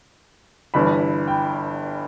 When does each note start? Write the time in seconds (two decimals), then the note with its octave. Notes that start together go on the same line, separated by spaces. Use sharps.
0.74 G1 G2 E3 B5
1.28 G5